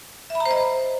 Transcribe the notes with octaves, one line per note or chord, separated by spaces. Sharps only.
E5
B5
A#5
C5
D#5